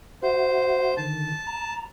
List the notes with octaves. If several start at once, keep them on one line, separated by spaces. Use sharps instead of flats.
F#4 C5 E5 F#5
D3 D#3 A5
A#5